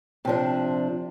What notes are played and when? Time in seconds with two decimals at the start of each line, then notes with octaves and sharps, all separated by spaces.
0.25 C3 F3 D4